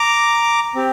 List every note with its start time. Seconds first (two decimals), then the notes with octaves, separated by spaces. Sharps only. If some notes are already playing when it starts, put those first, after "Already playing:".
Already playing: A#5 D6
0.75 C4 G4